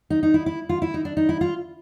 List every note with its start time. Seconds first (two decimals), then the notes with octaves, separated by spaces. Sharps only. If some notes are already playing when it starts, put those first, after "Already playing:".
0.10 D#4
0.23 D#4
0.34 E4
0.46 E4
0.69 F4
0.82 E4
0.94 D#4
1.05 D4
1.17 D#4
1.29 E4
1.41 F4